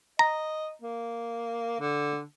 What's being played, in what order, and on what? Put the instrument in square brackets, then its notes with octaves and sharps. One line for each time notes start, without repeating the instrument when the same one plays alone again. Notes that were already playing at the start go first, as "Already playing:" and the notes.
[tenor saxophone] D#5 [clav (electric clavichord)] A#5
[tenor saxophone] A#3
D3